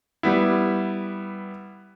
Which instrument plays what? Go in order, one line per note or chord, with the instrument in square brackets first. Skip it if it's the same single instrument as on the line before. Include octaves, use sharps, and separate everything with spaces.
[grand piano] G3 B3 E4